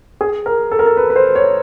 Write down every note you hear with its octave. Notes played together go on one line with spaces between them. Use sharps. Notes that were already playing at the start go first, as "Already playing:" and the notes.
G#4
A#4
A4
A#4
A4
B4
B4
C5
C#5